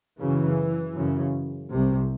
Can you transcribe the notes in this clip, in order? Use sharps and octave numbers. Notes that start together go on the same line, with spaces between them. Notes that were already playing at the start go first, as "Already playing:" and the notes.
F#2 C#3 E3
F#2 C#3
C2 C3